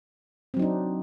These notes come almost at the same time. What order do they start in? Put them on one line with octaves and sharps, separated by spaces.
C4 F#3 D#4 D4